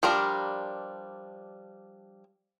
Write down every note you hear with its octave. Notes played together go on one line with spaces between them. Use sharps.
F3 G3 D4 A#4